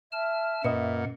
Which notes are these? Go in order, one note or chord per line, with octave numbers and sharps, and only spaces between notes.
E5 A5 F6
F#2 A#2 B4 D#5 F#5